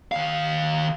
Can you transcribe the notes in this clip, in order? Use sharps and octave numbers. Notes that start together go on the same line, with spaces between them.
D#3 F5